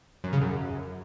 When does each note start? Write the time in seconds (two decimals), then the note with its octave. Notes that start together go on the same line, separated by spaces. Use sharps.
0.24 F#2
0.33 C#3
0.41 F#2